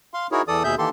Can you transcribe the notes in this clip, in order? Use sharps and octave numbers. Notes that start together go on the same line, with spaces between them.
F5 C6
D#4 E4 F#4 G#4 A#4 C#5
E2 E3 A4 D5 D#6
D#2 B2 G#4 E5 G6
D#3 E3 A#3 G4 A4 C6